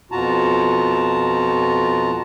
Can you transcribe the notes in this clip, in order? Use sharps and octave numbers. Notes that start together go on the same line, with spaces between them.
F2 B2 F4 F#4 A5 A#5